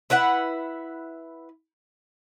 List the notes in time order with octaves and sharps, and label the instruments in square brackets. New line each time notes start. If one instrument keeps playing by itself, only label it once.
[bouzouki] E4 B4 E5 F#5